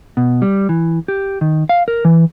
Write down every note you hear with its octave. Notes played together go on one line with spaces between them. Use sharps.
B2
G3
E3
G4
D#3
F5
A#4
E3